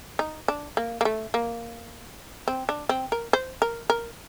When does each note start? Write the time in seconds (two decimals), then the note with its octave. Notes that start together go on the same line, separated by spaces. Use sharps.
0.19 D#4
0.48 D4
0.77 A#3
1.01 A#3
1.05 A3
1.34 A#3
2.48 C4
2.69 D4
2.89 C4
3.12 A#4
3.33 C5
3.62 A#4
3.90 A#4